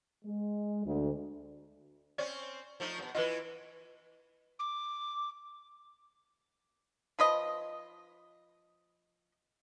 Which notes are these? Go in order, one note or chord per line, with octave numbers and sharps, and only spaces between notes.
G#3
D2
C4 C#4 D5
F3 A3 D#4
F#2 B2
E3 E4 F4 B4 D#5
D6
F3 B4 D#5